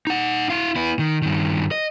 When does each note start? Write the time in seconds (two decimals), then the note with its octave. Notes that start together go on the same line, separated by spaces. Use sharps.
0.07 D#4 F#5
0.50 E4 F5
0.76 B3 E4
0.99 D#3
1.22 G2 D#3
1.71 D#5